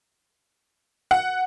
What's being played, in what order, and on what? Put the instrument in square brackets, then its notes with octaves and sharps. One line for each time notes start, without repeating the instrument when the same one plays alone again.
[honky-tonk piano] F#5